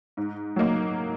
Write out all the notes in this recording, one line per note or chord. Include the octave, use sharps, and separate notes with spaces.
G#2
F#3 A#3 D#4